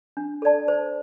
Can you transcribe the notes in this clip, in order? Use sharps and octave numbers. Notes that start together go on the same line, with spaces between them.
D4
A4 D5 A5
C5